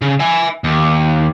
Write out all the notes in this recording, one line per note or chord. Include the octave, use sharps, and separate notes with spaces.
C#3
E5 G#5
D#2